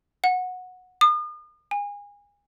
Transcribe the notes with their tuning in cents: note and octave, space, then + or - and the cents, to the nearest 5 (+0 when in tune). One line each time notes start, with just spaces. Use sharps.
F#5 -15
D#6 -40
G#5 -30